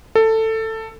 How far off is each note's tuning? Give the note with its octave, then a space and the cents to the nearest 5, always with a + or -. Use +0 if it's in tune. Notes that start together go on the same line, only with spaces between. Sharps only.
A4 +15